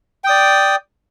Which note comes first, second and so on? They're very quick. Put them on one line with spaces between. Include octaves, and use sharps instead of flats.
G5 D#6 D5